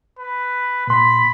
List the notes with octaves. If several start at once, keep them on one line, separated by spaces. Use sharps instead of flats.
B4
A#2 B5 C6